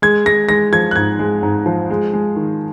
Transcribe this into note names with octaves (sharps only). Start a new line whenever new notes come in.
G#3 G#6
G#3 A#6
G#3 A#6
F3 G#6
F#6
G#2 G#6
G#3
G#2
F3
G#3
G#3
D#3